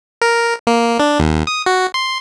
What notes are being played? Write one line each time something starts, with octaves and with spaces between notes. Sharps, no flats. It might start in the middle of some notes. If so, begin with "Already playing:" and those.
A#4
A#3
D4
D#2
D#6
F#4
C6